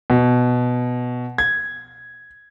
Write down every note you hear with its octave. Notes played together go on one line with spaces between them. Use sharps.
B2
G#6